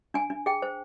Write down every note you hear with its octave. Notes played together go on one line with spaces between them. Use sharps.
D4 G#5
D4
G#4 G5
C5